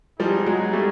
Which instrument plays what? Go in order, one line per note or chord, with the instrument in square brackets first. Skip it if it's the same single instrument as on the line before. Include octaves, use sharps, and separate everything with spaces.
[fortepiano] F3 G3 [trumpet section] B3 D#4 G#4
[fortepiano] F#3 G#3
G3 A3